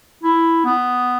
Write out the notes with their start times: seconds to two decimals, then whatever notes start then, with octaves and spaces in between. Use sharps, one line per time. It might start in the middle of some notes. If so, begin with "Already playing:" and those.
0.24 E4
0.65 B3